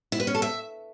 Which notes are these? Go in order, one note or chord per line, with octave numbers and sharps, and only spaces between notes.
E4
B4
C#4
A4
E5